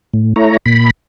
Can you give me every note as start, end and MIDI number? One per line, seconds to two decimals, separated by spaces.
0.14 0.34 45
0.36 0.57 57
0.36 0.57 64
0.36 0.57 73
0.36 0.57 82
0.66 0.90 46
0.66 0.90 83